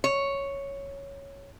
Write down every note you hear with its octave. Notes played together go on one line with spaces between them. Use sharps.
C#5